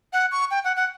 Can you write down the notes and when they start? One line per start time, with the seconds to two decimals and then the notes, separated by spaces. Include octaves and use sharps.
0.13 F#5
0.32 C#6
0.51 G5
0.64 F#5
0.76 F#5